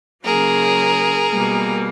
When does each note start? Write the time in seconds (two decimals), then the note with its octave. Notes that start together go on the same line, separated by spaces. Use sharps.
0.24 C#3 F#3 A#3 G#4 A#4
1.31 B2 G3 A#3